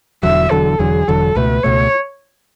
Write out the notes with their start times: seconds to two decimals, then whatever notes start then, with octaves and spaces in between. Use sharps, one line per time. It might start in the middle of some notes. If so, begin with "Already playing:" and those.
0.23 E1 E2 D3 F#3 E5
0.51 E1 E2 D3 F#3 A4
0.79 E1 E2 D3 F#3 G#4
1.08 E1 E2 D3 F#3 A4
1.35 C#2 B2 A3 B4
1.63 C#2 B2 A3 C#5